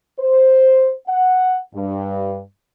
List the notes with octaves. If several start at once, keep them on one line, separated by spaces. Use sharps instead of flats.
C5
F#5
G2